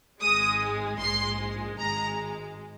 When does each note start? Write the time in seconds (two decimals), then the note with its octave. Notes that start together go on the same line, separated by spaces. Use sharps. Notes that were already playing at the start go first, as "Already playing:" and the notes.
0.21 G#1 G#2 G#3 D#6
1.00 A#1 G#2 G#3 C6
1.79 G#1 G#2 G#3 A#5